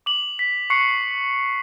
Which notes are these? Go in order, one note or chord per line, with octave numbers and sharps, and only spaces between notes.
D6 F#7
B6
C#6 F#6 C7 C#7